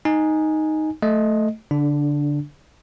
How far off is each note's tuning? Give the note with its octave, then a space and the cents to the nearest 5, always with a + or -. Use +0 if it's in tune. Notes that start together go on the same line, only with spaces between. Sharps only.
D#4 +0 G#5 +0
A3 +0 D#5 +0
D3 -30 D4 +0